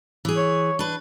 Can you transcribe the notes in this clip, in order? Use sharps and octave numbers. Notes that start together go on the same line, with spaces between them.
E3 G#4
C#5
D4 B4